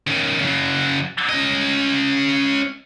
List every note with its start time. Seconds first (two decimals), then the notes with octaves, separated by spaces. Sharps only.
0.07 D#3 C#4
0.41 C#3 F#3
1.29 C#4 D#5